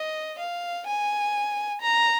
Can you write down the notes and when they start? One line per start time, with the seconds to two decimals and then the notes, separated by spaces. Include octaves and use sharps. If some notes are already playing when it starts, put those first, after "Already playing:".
Already playing: D#5
0.39 F5
0.87 G#5
1.82 A#5